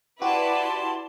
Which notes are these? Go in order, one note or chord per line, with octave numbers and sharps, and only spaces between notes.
E4 F#4 G4 B4 D5 A5 C6 D6